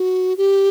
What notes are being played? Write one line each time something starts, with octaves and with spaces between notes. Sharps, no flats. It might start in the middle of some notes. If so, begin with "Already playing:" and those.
Already playing: F#4
G4